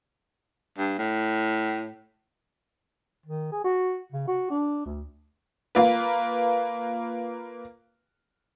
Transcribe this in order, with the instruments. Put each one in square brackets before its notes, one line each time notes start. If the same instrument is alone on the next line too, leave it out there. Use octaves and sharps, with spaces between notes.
[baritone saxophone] G2
A2
[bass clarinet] D#3
G#4
F#4
C#3
F#4
D4
D2
[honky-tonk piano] A#3 F4 B4